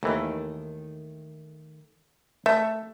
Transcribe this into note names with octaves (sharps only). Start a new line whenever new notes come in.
D#2 D#3 E3 A3
A3 E5